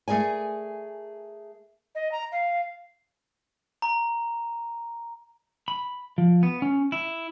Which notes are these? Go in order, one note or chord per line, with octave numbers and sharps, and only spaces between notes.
A3 G#4 A#4 D5 G#5
D#5
A#5
F5
A#5
B5
F3
B3
C#4
E4